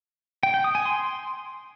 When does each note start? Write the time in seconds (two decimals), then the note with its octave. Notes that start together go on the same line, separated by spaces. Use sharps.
0.43 G5
0.54 G5
0.64 D#6
0.75 G#5
0.85 C6